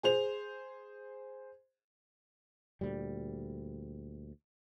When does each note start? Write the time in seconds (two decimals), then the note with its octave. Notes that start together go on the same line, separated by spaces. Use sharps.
0.03 G#4 C5 F7
2.81 D2 A#2 G3